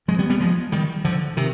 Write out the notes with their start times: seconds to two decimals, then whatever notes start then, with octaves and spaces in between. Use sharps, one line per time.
0.08 F3 G#3
0.19 G3 B3
0.30 G3 B3
0.40 F3 G#3
0.72 D#3 G3
1.05 D3 F3
1.37 C3 D#3